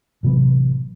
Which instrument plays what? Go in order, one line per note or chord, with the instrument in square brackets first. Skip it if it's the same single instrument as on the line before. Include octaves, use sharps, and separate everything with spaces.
[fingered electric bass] A1 C3 F#3 B3